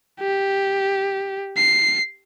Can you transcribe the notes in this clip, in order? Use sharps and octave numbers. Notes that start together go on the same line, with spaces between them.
G4
C7